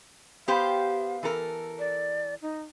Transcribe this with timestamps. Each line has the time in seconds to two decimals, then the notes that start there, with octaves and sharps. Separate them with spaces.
0.48 B3 G4 C5 F5
1.23 E3 A4 A#4
1.79 D5
2.42 D#4